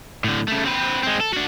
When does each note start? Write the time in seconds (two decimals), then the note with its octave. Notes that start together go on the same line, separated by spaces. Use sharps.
0.24 A2 D3
0.48 C#3 A3
0.65 C4 B4
1.03 G#3 C4
1.21 A4
1.33 D4 F#4